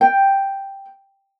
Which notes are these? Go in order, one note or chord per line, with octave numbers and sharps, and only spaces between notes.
G5